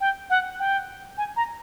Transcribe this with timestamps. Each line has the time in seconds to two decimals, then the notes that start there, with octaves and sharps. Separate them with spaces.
0.01 G5
0.30 F#5
0.59 G5
1.18 G#5
1.36 A#5